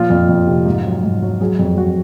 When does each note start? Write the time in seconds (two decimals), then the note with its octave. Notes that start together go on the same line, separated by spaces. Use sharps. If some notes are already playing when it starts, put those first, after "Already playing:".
Already playing: A#2 F3 F4
0.10 F2
0.29 F2
0.47 C3
0.66 G#2
0.85 F#3
1.03 G#2
1.22 F#3
1.41 F#3 G#4
1.59 F2
1.77 F2 F#4